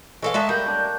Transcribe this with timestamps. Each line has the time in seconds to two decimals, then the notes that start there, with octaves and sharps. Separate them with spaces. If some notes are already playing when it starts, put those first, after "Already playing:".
0.22 E3 G#3 A4 C#5 F5 E6
0.34 G#3 E5 G5 A5 A#5 D#6
0.49 G3 A#3 A#4 A#5 G6
0.66 D4 D5 G5